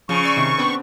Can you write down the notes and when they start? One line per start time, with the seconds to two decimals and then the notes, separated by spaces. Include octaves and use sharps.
0.09 C#3 F3 C#6
0.23 D5 E6 A6
0.36 C3 D#3 E7
0.59 B3 C4 D4